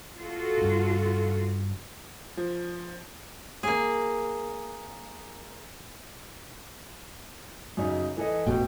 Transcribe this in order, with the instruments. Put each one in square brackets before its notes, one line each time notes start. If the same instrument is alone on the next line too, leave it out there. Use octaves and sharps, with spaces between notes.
[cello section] F4 F#4 A4
[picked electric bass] G2 C#3
[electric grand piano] F3
[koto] A#3 G#4
[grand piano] F#2 C#3 D#4
E3 A4 D#5
[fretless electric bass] E1 A1 B2 [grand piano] G5